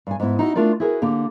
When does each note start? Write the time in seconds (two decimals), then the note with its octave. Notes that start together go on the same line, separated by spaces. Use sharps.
0.07 G2 G#5
0.20 G#2 B3 E4
0.39 D#4 E4 F#4 D#5
0.55 A3 D4 F4 A#4 D5
0.80 E4 F#4 G#4 A#4 B4
1.02 D3 A#3 G4